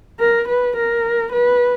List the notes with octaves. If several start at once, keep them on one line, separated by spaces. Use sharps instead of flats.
A#4
B4
A#4
B4